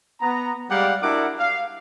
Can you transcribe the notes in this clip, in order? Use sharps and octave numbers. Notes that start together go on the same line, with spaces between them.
B3 A#5
G3 G#3 G4 D5 F5 F#5
D4 E4 F#4 A#4 F#5 D6
F5